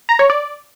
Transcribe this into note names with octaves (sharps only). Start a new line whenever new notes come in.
A#5
C#5
D5